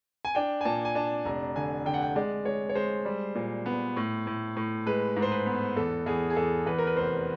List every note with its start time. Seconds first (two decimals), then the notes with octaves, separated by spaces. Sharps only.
0.25 G#5
0.35 D4 G5
0.61 G#5
0.65 A#2 A5
0.85 G#5
0.95 D4 A5
1.25 F1 A#5
1.56 D3 G#5
1.86 D3 G5
1.94 F#5
2.02 G5
2.16 G#3 D5
2.45 G#3 C#5
2.69 C#5
2.75 G#3 C5
3.05 G3
3.35 A#2
3.66 B3
3.96 A2
4.27 A2
4.56 A2
4.86 G#3 B4
5.17 G#2
5.22 C5
5.32 B4
5.46 B3
5.76 E2 A4
6.06 E2 G#4
6.30 G#4
6.36 E2 A4
6.66 E2 B4
6.78 A#4
6.87 B4
6.96 F1 C5